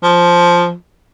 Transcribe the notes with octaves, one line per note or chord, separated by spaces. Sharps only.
F3